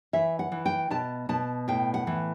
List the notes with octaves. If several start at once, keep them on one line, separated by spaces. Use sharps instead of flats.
E3 E5
F#5
E3
G5
B2 A5
B2 A5
A2 G5
F#5
E3